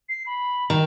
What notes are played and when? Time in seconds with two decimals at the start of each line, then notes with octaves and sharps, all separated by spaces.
0.09 C7
0.26 B5
0.70 D#3